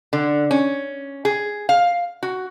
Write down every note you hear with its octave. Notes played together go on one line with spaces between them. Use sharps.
D3
C#4
G#4
F5
F#4